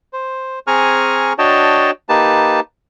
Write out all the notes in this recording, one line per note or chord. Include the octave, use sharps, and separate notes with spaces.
C5
C4 G#4 G#5 A#5 C#6 F6
D4 F#4 C#5 D#5 G5 A5
A#3 D#4 G4 B4 A5